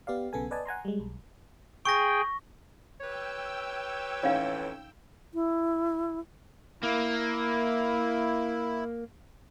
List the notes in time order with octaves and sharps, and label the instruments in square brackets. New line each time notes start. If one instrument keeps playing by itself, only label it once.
[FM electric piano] B3 G4 D5 F5
B1 C#3 B3 A4 G#5
B4 D5 D#5 G#5 A5
F#5 G#5 A#5 C6
G3 G#3
B1
[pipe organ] G#4 G5 [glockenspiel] C#6 A#6
[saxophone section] G4 B4 C#5 [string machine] G5 E6
[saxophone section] F2 A2 E3 [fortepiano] C#4 [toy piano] D#4 F5 B5
[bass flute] E4
[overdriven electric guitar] A#3 [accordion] E4